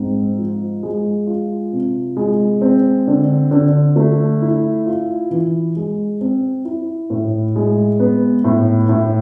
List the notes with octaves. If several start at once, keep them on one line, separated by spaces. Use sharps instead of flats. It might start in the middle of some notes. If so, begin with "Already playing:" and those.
Already playing: G#2 C4
F3
G#3
F4
C3
G#3
C4
D3
D3
A3
E4
F4
E3
G#3
C4
E4
A2
G#3
B3
A2
A2